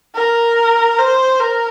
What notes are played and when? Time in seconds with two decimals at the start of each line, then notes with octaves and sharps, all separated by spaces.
0.15 A#4
0.99 C5
1.40 A#4